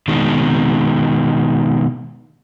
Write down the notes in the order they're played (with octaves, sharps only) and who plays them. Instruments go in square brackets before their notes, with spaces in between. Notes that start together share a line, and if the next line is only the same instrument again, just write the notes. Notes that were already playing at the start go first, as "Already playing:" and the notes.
[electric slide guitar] B2 D#3 G#3